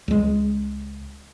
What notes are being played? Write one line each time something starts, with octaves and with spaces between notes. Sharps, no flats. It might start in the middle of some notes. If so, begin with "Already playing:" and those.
C#2 G#3